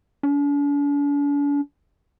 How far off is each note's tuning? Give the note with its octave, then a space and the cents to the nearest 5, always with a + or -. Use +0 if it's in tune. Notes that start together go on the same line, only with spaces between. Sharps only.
D4 -45